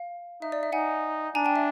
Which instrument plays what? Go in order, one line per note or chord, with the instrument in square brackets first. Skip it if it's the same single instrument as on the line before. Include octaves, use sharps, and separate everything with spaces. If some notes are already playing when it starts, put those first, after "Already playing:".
Already playing: [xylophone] F5
[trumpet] D#4 [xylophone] E5
[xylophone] D5
E5
[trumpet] D#4 [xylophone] F#5 G#5
[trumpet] D4 [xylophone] G#5 A#5
[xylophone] G5 A5
E5